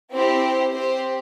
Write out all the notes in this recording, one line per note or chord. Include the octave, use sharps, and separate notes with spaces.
C4 E4 G4 C5
C4 G4 C5